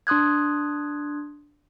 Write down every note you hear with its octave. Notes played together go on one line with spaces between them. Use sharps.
D4 C6 D#6 F#6 G#6